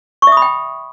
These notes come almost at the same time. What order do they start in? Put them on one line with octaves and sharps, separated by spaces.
C#6 E5 D#6 B5 G5